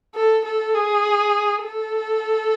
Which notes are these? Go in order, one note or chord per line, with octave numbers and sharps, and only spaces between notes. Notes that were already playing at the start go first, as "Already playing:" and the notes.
A4
A4
G#4
A4